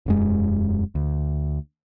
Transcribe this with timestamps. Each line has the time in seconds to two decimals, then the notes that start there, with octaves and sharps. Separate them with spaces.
0.06 E1 F#2 G#3
0.95 D2